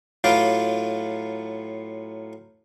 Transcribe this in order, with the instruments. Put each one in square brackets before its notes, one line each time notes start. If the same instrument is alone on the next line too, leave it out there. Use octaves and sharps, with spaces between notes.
[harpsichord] A2 F#3 F4 B4 F5 D6